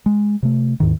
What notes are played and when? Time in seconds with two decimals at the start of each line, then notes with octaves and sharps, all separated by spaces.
0.06 G#3
0.43 C3 A3
0.80 D#2 G#2 D#3